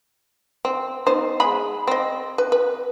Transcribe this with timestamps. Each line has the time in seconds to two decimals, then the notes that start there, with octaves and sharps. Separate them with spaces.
0.65 C4
1.07 B3 D#4 C5
1.40 G#3 G#4 B5
1.87 C4 D#5
2.38 B4
2.52 B4